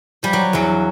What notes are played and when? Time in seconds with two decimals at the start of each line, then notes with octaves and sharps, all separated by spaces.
0.23 F3 G3
0.33 F#3
0.53 E2 F#3